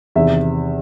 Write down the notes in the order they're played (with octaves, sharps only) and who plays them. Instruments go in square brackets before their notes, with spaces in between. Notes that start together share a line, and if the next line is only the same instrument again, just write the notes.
[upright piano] E2 C3 D#3 E5